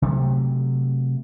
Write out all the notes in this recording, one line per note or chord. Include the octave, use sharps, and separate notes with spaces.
C3 F#3 A3